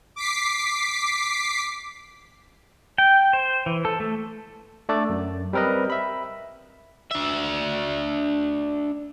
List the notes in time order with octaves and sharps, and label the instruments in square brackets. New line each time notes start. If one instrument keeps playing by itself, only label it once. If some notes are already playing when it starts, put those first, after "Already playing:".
[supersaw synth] D6 B6 C7
[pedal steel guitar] G5
C5
E3
A4
A3
[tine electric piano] A3 D4 A4 D5
F#2
G3 C4 A#4 B4 D#5
E5 B5
[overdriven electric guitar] D4 E5